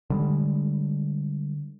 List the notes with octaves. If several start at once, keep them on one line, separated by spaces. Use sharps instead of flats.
D3 G3 G#3